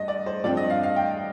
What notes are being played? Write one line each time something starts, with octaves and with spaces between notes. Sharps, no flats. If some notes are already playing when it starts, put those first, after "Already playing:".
Already playing: G2 D#5
D5
C5
G2 F3 C4 D5
D#5
F5
F5
G5